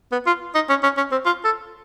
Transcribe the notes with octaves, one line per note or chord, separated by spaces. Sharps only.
B3
F4
D#4
C#4
C#4
C#4
C4
F4
A4